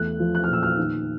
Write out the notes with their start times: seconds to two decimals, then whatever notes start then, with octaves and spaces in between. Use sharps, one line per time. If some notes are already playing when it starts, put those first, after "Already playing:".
Already playing: E2 A3 F#6
0.20 F3
0.35 F#6
0.44 F6
0.49 A#2 E6
0.63 F6
0.77 D#3